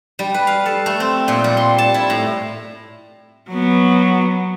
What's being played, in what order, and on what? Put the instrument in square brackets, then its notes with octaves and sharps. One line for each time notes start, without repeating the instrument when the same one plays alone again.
[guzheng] G3
B4
F5
A4
A3
C4
A#2
G3
C6
A5
E4
A2
[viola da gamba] F#3 B3